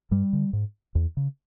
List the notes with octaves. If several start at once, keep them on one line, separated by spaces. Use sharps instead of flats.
G2 G3
D3
G#2
E2
C#3